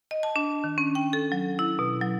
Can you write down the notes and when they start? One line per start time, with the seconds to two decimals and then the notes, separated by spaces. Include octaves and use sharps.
0.11 D#5
0.23 A5
0.36 D4
0.64 D#3
0.78 C#4
0.95 G5
1.13 A4
1.32 F#3
1.59 E4
1.79 B2
2.01 F#3